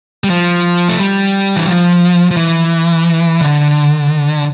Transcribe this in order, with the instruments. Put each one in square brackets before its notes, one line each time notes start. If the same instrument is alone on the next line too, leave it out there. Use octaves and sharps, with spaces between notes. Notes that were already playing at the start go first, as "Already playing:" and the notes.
[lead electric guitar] G3
F3
A3
G3
E3
F3
F3
E3
D3